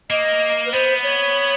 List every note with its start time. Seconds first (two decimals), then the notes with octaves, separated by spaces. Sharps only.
0.10 A#3 D#5
0.66 B4
0.72 B3 C5
1.03 C#5